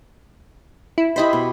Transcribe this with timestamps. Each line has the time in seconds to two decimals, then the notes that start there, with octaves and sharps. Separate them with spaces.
0.98 E4
1.16 E4 G4 C5 D#5 B5
1.33 B2